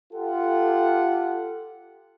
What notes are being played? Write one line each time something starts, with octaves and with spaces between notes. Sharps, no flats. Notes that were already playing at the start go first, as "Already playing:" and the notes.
F4 G4 A4 F#5